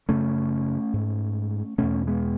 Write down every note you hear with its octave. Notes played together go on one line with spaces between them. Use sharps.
F#2 C#3 A3 C#4
G#2
E2 B2 A3 C#4
G#3 B3